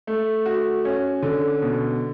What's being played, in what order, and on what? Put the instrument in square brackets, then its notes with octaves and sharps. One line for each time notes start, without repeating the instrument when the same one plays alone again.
[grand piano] A3
F#4
C#4
D3
B2